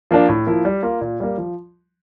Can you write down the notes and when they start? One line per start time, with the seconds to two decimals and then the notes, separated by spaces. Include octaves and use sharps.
0.11 F3 A#3 D4
0.29 A2
0.47 F3 A#3 E4
0.65 G3
0.83 A#3 F4
1.01 A#2
1.20 G3 A#3
1.38 F3